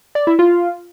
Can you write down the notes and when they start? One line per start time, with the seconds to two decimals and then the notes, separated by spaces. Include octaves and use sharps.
0.15 D5
0.27 E4
0.39 F4